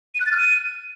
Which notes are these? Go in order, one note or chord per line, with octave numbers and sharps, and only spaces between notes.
D#7
F#6
A6
F6
D#7